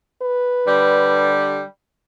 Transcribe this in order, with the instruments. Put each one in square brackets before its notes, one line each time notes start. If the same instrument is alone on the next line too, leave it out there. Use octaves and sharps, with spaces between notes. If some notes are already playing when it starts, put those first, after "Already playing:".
[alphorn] B4
[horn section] D3 G3